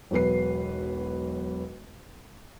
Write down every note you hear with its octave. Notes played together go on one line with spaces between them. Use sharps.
E1 B1 B4 C7